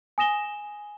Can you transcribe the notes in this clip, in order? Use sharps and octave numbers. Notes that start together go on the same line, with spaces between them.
G#5 D#6 A#6 E7 G7